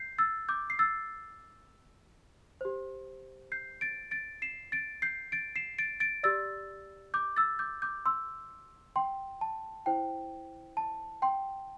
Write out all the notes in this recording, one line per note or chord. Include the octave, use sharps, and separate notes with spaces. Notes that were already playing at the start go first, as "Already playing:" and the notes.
Already playing: G6 C7
E6 A6
D6 G6
C7
E6 A6
G4 C5
G6 C7
A6 D7
A6 D7
C7 E7
A6 D7
G6 C7
A6 D7
C7 E7
A6 D7
A6 D7
G4 D5 E6 A6
D6 G6
E6 A6
D6 G6
D6 G6
C6 E6
G5 C6
A5
E4 C5 G5
A5
G5 C6